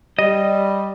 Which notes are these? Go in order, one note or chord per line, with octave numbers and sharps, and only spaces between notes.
G3 D#5